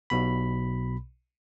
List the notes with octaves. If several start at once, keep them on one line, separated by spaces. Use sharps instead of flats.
B1 B2 B5